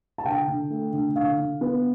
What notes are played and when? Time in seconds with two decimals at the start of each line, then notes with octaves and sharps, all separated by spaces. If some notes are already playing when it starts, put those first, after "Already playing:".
0.18 A5
0.25 D3 G5
0.48 D3
0.70 A3
0.93 D3
1.16 D3 F5
1.38 D3
1.61 B3